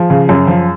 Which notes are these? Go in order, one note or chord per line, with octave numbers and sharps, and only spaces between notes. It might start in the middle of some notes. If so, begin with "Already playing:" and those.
Already playing: F3 G#4
C#3
F#2
F3